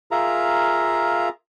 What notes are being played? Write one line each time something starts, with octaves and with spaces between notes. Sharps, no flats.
F4 G#4 A#4 E5 F5 A#5